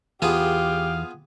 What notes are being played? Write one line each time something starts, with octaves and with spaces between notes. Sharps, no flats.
E2 B3 F4 G4 G#4 F5